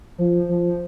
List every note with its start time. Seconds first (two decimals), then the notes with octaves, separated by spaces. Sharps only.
0.18 F3
0.49 F3